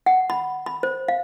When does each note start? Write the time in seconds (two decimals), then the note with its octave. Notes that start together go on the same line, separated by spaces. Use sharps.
0.06 F#5
0.30 B5
0.66 B5
0.83 C5
1.08 F5